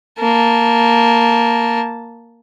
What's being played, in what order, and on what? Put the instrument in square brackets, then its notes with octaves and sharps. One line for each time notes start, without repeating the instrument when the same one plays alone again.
[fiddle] A#3 A5